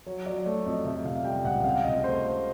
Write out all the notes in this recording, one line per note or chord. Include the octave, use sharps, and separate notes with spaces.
F#3 C#5
F#3 D5
A3 D5
F2 D#5
C3 E5
C3 F5
G3 G5
C#2 F#5
C3 F5
C3 D#5
A3 C5
A3